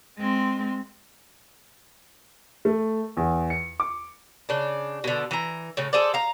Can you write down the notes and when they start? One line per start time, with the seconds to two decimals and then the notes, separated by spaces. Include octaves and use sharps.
0.18 G#3 C4
2.65 A3
3.17 E2
3.50 C#7
3.80 D6
4.49 C#3 D4
5.04 B2 D3
5.31 E3 A#5
5.77 A2 C#3
5.93 G#4 A4 C5 D5
6.14 F5 A#5